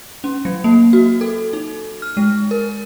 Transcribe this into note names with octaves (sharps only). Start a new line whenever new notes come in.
C#4
F#3
A#3
F#4
A4
D#4
F6
G#3
A#4